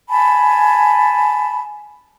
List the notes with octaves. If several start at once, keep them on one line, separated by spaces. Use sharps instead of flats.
G#5 A5 B5